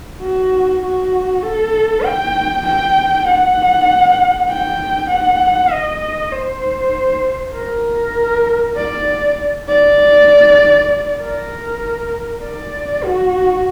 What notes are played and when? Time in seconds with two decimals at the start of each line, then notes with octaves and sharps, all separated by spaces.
0.22 F#4
0.82 F#4
1.43 A4
2.05 G5
2.66 G5
3.27 F#5
4.48 G5
5.10 F#5
5.71 D#5
6.32 C5
7.55 A#4
8.77 D5
9.68 D5
11.21 A#4
12.43 D5
13.04 F#4